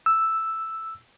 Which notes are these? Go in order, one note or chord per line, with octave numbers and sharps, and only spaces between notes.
E6